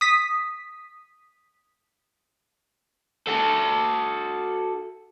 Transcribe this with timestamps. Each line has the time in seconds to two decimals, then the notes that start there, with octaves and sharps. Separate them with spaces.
0.01 D#6 B6
3.27 F#4 A4